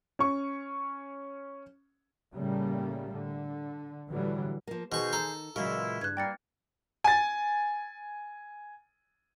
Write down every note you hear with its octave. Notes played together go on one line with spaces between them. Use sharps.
C#4 C#6
A2 C#3 G3 A3 A#3
D3
A2 D3 E3 F#3 G3
F3 A#3
B2 D#3 G#4 C5 C#6
A4 A#5
A#2 C#3 E3 F#3 G#3 E4
G2 F#6 G#6
G3 A#3 G5 A6 C#7
G#5 A6